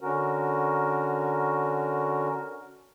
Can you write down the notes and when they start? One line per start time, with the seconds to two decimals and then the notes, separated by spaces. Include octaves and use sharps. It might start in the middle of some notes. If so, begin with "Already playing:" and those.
0.01 D3 C#4 F#4 A#4